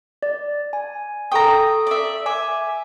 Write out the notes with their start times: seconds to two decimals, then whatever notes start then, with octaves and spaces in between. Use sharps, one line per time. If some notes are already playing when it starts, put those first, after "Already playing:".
0.23 D5
0.73 G#5
1.32 A4 G5 A#5 C#6 D#6
1.87 D5 E5
2.26 E5 G#5 D6